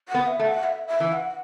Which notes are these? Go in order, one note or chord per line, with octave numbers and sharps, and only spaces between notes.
F#5
B3
E5
A3
F#5
E5
E5
E3
F#5